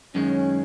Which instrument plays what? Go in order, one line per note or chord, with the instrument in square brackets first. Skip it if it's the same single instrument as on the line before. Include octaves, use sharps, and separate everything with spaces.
[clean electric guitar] F#2 D#3 G#3 [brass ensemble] C#4